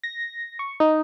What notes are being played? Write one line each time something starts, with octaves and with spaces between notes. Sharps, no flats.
A#6
C#6
D#4